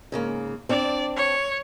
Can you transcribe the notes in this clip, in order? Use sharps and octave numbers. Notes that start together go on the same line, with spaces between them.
G#2 C#3 A#3
C4 D4 D5
C#5